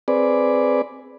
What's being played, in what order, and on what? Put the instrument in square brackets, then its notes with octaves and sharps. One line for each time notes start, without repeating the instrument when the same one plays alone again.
[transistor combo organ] C4 G#4 B4 D5